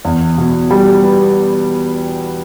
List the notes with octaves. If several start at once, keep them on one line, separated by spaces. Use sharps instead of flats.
E2
B2
G3
B3